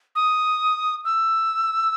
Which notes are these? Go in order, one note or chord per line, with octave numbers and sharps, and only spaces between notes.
D#6
E6